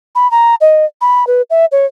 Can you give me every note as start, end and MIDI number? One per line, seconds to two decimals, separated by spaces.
0.15 0.30 83
0.31 0.55 82
0.61 0.85 75
1.01 1.27 83
1.27 1.42 71
1.50 1.65 76
1.72 1.85 73